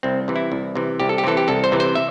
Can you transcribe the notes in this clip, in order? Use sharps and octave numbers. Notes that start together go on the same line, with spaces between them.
C2 C4
C3 E3
E4
C2
C3 E3
C2 G4
A4
G4
C3 E3 A4
G4
C2 A4
C5
C3 E3
C5
E5